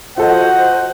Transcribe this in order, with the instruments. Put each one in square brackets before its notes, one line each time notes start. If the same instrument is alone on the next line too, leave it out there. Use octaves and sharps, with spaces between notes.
[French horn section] F3 F#4 [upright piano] F4 A4 D#5 [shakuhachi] C5 [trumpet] F#5